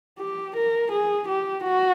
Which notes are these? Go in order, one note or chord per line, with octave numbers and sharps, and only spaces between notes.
G4
A#4
G#4
G4
F#4